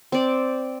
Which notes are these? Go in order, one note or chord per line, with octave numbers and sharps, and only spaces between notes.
C4 D5